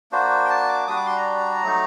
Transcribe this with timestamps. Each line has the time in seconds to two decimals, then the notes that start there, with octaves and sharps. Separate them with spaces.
0.12 A#3 D4 F#4 C5
0.45 G5
0.50 A5
0.69 D6
0.88 G3 D4 F#4 D#6
0.97 D6
1.06 C6
1.16 A#5
1.63 F#3 A3 D#4